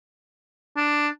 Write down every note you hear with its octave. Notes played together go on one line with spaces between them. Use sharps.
D4